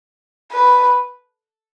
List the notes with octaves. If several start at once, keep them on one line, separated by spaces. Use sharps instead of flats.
B4